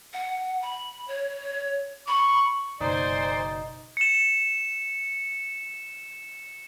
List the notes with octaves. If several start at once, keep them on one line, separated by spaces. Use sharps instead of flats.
F#5
B5
C#5
B5 C#6
F#1 B2 D#4 C5 D5 G#5
C#7 E7